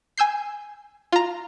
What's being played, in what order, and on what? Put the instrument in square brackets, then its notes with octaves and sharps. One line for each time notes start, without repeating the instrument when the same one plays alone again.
[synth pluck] G#5 E6 G6 C7
F4 A#5